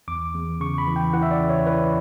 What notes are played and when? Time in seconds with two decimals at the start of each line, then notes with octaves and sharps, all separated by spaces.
0.08 E2 D6
0.34 E2
0.60 C#3 C#6
0.78 B5
0.87 E3
0.96 G5
1.13 E3 F#5
1.23 E5
1.31 D5
1.40 C#3
1.49 C#5
1.67 E3 B4